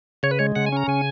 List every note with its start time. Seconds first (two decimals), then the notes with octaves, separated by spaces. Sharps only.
0.23 C#3 C#5
0.31 B4
0.39 G#3 C#5
0.56 C#3 F#5
0.66 G#5
0.72 C#4 A#5
0.87 C#3 G#5